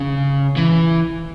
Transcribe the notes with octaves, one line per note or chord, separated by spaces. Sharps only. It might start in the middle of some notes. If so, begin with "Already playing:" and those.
Already playing: C#3
E3